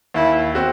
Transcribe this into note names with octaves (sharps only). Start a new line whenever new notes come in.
D#2 E4
C4 F#4